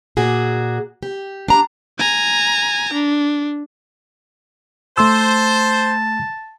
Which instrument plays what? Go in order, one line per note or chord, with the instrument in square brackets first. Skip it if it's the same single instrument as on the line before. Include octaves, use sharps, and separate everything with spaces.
[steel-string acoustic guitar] A#2 F#4 G#4
G4
D4 A#5
[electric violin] G#5 A#5
D4
[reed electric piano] A3 C6 E6 [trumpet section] C5 [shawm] A5